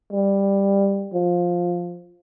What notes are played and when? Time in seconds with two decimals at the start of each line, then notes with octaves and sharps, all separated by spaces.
0.13 G3
1.14 F3